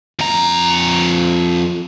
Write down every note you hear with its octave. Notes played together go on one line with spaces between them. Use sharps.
F2 A#5